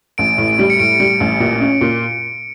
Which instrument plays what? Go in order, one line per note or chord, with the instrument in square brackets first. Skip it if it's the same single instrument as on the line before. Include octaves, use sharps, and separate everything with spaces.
[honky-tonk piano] A1 [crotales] D7
[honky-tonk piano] A2
[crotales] D7
[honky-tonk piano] G3
[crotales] C#7
[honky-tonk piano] A2 [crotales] D7
[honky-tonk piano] G3
A1
A#2
C#4
A#2